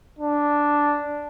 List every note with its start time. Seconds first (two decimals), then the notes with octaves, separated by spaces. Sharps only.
0.19 D4